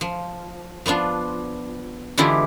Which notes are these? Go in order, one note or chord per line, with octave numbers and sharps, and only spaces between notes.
F3
F3 B3 D4 F4
D3 E3 G#3 E4 F4 G4